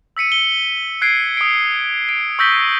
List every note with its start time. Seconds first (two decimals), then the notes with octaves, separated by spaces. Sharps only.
0.17 E6 B6 C#7 D#7
0.32 G7
1.02 F#6 G#6 C7 D7
1.37 D#6 D7
2.09 D7
2.39 C#6 E6 G6 A#6 B6 G7